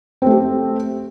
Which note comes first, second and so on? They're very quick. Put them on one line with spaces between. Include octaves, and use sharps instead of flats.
C4 A3 G4